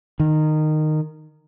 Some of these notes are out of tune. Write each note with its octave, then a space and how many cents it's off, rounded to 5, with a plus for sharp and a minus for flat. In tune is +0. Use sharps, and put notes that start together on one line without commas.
D#3 -15